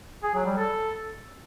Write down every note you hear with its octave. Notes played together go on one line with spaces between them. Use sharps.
G#4
F#3
G3
A4